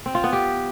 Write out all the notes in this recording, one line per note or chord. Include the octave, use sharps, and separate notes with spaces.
C4
F4
B3
G4